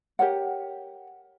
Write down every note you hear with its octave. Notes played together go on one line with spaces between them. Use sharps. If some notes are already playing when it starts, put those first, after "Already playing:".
G4 A#4 C#5 F#5